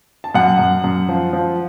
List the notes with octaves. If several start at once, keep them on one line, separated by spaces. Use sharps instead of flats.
A5
F#2 F#5
F#2
F#2
F3
F3